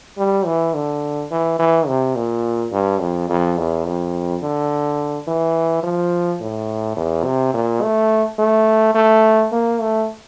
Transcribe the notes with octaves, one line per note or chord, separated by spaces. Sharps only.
G3
E3
D3
E3
E3
C3
A#2
G2
F2
F2
E2
F2
D3
E3
F3
A2
E2
C3
A#2
A3
A3
A3
A#3
A3